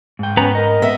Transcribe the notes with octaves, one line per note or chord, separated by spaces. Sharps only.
G#2 G5
B3 C#4 B4 A#5
A#4 D#5
B3 E5